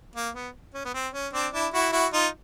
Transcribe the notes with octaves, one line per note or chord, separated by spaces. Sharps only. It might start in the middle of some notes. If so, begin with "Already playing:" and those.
A#3
B3
C#4
B3
C4
C#4
C4 D4
D4 E4
E4 F#4
E4 F#4
D#4 F4